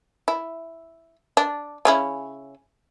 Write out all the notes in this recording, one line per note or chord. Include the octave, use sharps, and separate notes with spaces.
E4
D4
C#3 C#4 E4